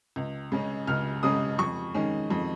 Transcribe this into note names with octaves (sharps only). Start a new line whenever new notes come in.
C#2
C#3 G#3 C#4
C#2 F6
C#3 G#3 C#4 D#6
F2 C#6
D#3 G#3 C#4
F2